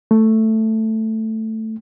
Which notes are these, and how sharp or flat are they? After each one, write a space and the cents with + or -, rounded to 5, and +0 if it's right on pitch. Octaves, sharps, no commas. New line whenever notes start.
A3 +5